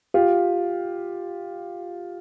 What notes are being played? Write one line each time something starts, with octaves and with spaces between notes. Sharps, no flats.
F4 G4